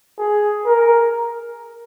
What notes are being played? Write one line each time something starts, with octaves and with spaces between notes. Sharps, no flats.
G#4
A#4